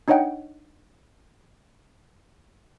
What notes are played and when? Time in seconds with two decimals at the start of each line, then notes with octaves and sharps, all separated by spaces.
0.08 D4 D#4 C#5 D#5 F#5 G5